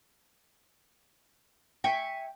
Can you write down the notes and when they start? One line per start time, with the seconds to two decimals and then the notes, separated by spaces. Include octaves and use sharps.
1.84 E5 G5 G#5 C#6